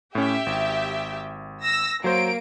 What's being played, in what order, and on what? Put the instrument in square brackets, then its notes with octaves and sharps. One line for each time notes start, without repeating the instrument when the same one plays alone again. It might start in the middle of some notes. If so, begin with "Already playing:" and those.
[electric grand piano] A2 C#4 [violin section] G4 E5
[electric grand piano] G#1
[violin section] E6 A#6
[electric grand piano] F#3 C5 [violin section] A#3 D7